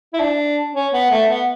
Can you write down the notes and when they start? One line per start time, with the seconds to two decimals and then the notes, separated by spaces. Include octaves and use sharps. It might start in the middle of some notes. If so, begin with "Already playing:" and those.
0.13 E4
0.20 D4
0.75 C#4
0.93 B3
1.11 A3
1.29 B3